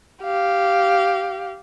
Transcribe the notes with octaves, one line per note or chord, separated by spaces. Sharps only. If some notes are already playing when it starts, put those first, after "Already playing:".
G4 F5